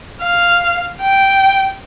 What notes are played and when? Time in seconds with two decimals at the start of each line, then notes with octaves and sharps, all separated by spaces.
0.22 F5
1.01 G5